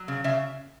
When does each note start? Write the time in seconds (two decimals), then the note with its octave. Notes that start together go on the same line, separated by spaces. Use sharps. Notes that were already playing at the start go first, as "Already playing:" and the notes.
Already playing: F#3
0.08 C#3
0.24 C#3 E5